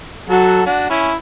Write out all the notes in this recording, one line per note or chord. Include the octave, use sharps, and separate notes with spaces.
F#3 F#4 A4
D4 F#4
C#4 E4